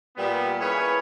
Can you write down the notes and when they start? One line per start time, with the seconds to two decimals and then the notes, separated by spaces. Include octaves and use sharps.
0.17 A#2 G3 B3
0.60 C#4 E4 G#4 A#4 B4 C#5